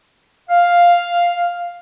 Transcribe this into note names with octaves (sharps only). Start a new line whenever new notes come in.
F5